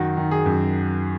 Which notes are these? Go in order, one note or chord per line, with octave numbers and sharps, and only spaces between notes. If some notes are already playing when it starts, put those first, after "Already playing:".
Already playing: F#2 D#3 F#4
D#3
G#4
F#2